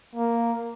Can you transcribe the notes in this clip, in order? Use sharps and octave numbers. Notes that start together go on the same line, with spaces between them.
A#3